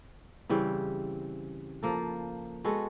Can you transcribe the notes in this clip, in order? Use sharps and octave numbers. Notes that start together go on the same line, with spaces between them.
C#3 E3 G3 C4
F3 A#3 A4
G#3 B3 F#4 A4